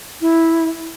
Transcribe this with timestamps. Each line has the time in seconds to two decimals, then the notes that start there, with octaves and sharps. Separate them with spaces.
0.21 E4